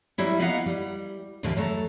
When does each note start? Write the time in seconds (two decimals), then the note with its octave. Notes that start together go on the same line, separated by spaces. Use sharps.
0.18 F#3 G3 E4 E5
0.39 A#3 B3 D#4 D#5 F5 F#5
0.66 G3
1.43 D#2 A2 D3 E3 A#3 G4
1.57 F#3 A3 A4 A#5